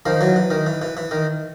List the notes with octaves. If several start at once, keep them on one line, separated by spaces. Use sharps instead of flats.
D#3 F3
E3 F#3
E3
D#3
E3
E3
E3
D#3